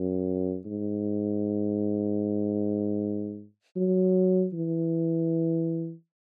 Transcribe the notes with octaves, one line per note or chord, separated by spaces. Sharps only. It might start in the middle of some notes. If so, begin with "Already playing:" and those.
Already playing: F#2
G#2
F#3
E3